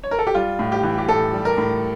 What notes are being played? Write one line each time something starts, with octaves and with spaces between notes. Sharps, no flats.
C#5
A#4
A4
G4
G3 F4
A2
G4
E3
G4
A2 A4
G3
A#4
A2